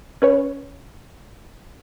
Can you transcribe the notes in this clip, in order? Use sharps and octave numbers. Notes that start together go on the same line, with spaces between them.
C#4 B4 C#5